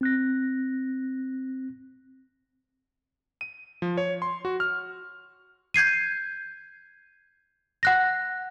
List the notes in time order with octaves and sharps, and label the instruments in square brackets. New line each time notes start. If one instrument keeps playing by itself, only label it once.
[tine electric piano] C4 F#6 A#6
[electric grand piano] D#7
F3
C#5
C6
F#4
F6
[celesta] G6 G#6 C7 D#7
F#5 F#6 A#6